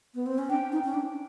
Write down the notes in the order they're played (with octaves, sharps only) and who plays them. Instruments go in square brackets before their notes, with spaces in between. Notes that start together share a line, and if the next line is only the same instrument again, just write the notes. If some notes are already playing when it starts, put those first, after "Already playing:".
[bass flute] B3
C4
C#4
[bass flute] D4 [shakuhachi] G5
[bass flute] D#4
C#4
D4